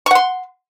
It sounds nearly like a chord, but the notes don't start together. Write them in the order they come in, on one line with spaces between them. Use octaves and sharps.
C#6 F#5 C6